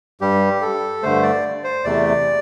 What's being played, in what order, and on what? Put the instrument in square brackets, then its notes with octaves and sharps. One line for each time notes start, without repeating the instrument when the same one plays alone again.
[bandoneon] G2 G3 G4
A4
G2 D3 A3 C5
D5
C5
E2 C3 A3 D5